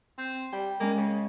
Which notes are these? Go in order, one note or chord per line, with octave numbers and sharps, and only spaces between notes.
C4
G3 G5
G#3 A#3 C#4
C#3